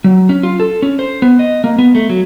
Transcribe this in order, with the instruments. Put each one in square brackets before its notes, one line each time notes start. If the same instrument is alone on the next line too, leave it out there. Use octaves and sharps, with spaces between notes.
[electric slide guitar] F#3
C#4
F4
A4
C#4
C5
B3
D#5
A#3
B3
A3
F#3